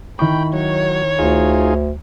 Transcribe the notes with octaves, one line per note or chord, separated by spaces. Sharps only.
D#3 E4 G5 B5 C#6
F#3 C#5
D2 D#4 F4 G#4